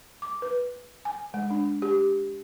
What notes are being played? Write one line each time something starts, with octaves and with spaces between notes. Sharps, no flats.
D6
B4
G#5
G#3
D4
G4